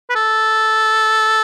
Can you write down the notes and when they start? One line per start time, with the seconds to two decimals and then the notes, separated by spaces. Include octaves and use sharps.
0.10 B4
0.15 A4